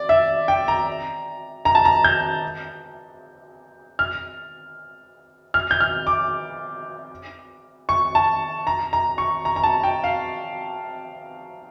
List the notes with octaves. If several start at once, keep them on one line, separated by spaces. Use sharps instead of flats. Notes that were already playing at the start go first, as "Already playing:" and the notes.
Already playing: D5
E5
G5
A#5
A#5
A5
A#5
G6
F6
F6
G6
F6
D6
C#6
A5
A#5
A#5
C#6
A#5
A#5
A5
G5
F5